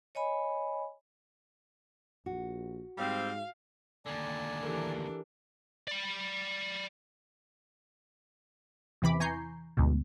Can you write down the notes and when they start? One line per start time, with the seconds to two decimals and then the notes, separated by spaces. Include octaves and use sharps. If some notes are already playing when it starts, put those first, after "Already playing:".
0.15 C#5 D#5 G#5 B5
2.26 A#1 F#4
2.98 G#2 G3 C4 F5
4.06 D#2 D3 D5 G#5 A5
4.63 E3 D4 G4 A4 A#4
5.88 D5 B5
9.02 E2 C3 E3 B5 D6
9.20 E3 G#5 A#5 C#6 G6 C7
9.77 D2 G#2 B2